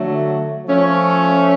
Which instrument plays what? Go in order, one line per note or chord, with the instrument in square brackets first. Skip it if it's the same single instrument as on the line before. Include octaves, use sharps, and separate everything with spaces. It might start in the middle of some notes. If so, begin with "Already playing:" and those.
Already playing: [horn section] D3 F#3 A3
F3 A3 C#4